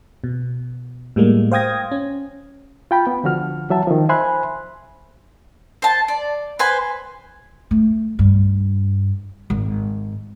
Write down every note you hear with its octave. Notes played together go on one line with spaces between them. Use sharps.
B2
A2 G3 G#3 A#3
C5 F5 G5 D#6 G#6 A#6
C#4
F4 G5 B5
B3
C2 D3 F3 F#4 F6
E3 F#3 E5 A5
D#3 F3
C5 E5 G#5 B5 C6 F#6
C5 A5
D5
B4 C5 G#5
A3
G2
G#1